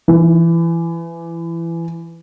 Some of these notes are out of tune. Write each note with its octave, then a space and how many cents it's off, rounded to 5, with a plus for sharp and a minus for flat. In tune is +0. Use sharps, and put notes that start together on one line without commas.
E3 +20